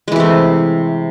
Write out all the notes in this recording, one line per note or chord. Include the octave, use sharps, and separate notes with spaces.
C3 E3 G#3 A3